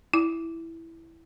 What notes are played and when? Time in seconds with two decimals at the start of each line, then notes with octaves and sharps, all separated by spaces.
0.14 E4